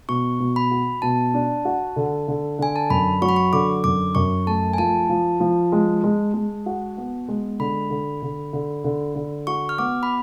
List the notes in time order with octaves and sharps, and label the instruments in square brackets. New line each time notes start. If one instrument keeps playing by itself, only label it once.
[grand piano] B2 [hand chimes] C#6
[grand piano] B2
[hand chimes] B5
[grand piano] F#4
[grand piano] B2 [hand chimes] A5
[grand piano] D4
F#4
D3
D3
[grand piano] D3 [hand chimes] G#5
[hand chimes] A5
[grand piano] F#2 [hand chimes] B5
[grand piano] F#3 [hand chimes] C#6
[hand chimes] B5
C#6
[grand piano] D3 [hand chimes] D6
[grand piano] F#2 [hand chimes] D6
[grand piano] F#2 [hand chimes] C#6
[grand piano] A3 [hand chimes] A5
[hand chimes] G#5
[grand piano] F3 [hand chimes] A5
[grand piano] F3
F3
G#3
G#3
G#3
F#4
B3
G#3
[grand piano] D3 [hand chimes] B5
[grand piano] D3
D3
D3
D3
D3
[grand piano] F#4 [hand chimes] C#6
[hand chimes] F6
[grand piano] B3 [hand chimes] D6
[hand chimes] B5